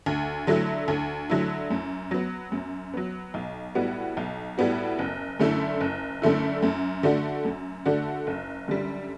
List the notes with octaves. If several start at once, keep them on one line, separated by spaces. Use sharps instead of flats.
D2
D3 F#3 A3 E4
D2
D3 F#3 A3 E4
F#2
F#3 B3
F#2
F#3 B3
B1
A2 G3 B3 F#4
B1
A2 G3 B3 F#4
F#1
F#2 D3 A3 E4
F#1
F#2 D3 A3 E4
F#2
D3 A3 D4 F#4
F#2
D3 A3 D4 F#4
F#1
F#2 D3 G3